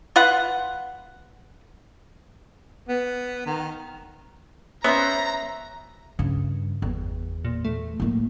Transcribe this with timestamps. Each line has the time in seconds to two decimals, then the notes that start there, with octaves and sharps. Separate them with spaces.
0.16 F4 B4 F#5
2.89 B3
3.46 D#3
4.84 B3 C#4 C5 E5 A#5
6.19 G2 C#3
6.82 G1 E2
7.45 A#2
7.64 A3
8.00 A2 A#3